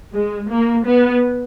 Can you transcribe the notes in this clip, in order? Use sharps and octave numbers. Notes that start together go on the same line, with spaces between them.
G#3
A#3
B3